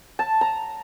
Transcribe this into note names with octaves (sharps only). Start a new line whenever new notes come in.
A5
A#5